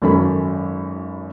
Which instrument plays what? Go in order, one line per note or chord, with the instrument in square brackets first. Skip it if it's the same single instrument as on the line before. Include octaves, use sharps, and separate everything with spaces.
[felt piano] G#1 F#2 C#4 A4 A#4 B5